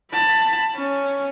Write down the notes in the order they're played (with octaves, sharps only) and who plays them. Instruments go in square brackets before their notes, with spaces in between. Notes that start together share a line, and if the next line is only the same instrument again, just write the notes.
[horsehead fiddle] A5 B5
C#4